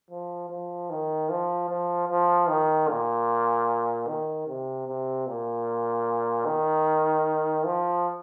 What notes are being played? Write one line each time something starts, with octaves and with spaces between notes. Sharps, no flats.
F3
F3
D#3
F3
F3
F3
D#3
A#2
D#3
C3
C3
A#2
D#3
F3